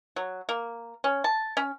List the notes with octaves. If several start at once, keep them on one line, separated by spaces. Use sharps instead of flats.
F#3
A#3
C#4
A5
C#4